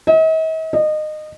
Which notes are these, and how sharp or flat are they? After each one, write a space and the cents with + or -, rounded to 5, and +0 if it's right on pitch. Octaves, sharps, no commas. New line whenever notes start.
D#5 +45
D#5 -25